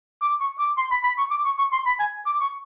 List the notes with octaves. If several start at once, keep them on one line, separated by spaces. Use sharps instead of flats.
D6
C#6
D6
C6
B5
B5
C#6
D6
C#6
C#6
C6
B5
G#5
D6
C#6